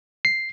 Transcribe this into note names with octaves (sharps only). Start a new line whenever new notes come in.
C7